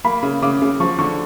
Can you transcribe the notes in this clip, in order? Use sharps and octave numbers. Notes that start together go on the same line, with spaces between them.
A#3 B5
C#3
C#3 D6
C#3
F3 C#6
D3 C#6